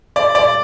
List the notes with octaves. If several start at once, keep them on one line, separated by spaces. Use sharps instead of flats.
D5
D5